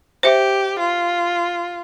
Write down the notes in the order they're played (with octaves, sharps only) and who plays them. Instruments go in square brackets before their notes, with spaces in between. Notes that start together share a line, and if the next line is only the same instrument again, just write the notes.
[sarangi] G4 [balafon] C5 E5
[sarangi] F4